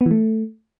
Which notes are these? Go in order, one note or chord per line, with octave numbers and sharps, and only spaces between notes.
B3
E3
A3